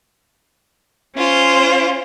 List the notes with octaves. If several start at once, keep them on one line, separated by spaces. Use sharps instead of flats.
C#4 F4 C5